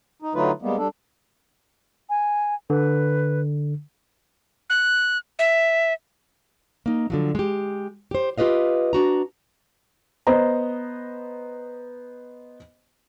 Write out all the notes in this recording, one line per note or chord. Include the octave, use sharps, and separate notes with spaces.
D#4
D3 F#3 A3 D#4 F4 B4
G3 G#3 A#3 B3
G3 D4 A4
G#5
D3 B4
F#6
E5
A#3 D#4
D3 F3 F#3
G#3 G4
G4 C5
F4 G4 B4 D#5 F5
D4 F#4 A#5
B3 C5 D#5 A#5